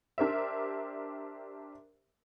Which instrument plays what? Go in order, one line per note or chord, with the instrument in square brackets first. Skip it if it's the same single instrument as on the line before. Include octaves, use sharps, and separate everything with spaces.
[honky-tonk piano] D4 G4 A#4 C5 E5